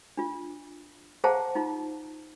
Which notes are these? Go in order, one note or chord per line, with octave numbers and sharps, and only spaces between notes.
D4 F4
G#4 C5 F5 F#5 A5 A#5
D#4 F4 A#5